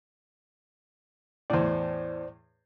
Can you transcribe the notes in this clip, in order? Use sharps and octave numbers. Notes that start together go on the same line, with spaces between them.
E2 A2 C5 D5